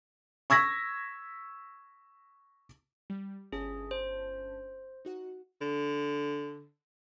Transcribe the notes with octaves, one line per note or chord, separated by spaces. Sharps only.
C#6 E6 G#6 A#6 B6
G3
G1 C#4 G#4 A5
C5
D#4 F#4 F#5
D3